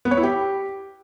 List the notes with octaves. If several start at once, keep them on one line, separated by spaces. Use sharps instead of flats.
B3
C#5
E4
G4